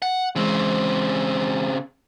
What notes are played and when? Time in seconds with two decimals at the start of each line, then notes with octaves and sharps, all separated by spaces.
0.02 F#5
0.36 C#3 E3 G#3 C4